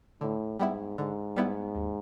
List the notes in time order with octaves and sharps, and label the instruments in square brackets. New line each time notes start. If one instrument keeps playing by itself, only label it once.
[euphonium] A2 [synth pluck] D3
[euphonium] G#2 [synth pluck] G3 B3 E4
[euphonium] G#2 [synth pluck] D3
[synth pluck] G3 B3 E4
D#2